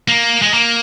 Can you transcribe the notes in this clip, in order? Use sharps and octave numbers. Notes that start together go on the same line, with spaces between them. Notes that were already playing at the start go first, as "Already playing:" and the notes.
A#3
G#3
A#3